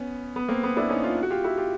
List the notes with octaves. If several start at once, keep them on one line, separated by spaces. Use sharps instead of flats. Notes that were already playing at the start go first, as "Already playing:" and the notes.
Already playing: B3 C#4
B3
A#3 C4
B3
D4 E4
C#4 D#4
D#4 F4
F#4
F4 G4
E4 F#4
F4 G4